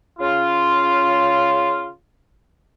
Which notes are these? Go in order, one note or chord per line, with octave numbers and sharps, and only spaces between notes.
C#3 F4